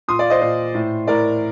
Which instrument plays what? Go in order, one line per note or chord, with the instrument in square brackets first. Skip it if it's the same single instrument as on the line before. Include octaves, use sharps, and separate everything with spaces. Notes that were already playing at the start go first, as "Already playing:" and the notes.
[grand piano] A#2 C6 D#6
D5 F5
C5 D#5
A#2 C5
A2
A2 A#4 D5